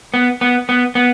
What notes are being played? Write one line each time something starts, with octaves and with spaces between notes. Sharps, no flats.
B3
B3
B3
B3